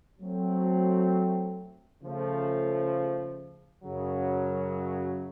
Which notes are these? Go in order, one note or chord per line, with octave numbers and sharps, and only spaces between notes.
F#3 A3 C4
C#3 F3 A3
F#2 C#3 F#3